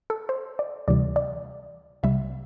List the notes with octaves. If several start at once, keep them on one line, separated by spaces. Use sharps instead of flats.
A4
C5
D5
D2 C3 E3 G3 D5
D5
C2 C3 G3 E5